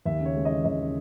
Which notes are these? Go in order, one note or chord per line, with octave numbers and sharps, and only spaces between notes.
D#2 E5
C#3
C#5
G#3
E3 D#5
D#2 D#5
C#3